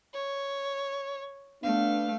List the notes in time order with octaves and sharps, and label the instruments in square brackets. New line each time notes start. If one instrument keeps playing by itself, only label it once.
[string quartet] C#5
[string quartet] A3 F5 [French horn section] B3 D4